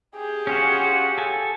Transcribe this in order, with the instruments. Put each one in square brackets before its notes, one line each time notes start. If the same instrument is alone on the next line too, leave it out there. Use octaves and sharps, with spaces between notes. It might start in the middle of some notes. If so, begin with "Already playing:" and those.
[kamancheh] G4 G#4
[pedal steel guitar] C#4 F4 F#4
A4 G#5